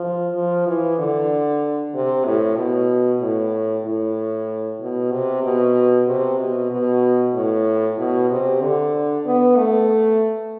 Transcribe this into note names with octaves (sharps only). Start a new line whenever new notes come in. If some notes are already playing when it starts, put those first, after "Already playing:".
Already playing: F3
F3
E3
D3
C3
A2
B2
A2
A2
B2
C3
B2
C3
B2
B2
A2
B2
C3
D3
B3
A3